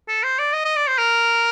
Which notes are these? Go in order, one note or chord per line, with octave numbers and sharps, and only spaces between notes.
A4
C5
D5
D#5
D#5
D5
C5
A#4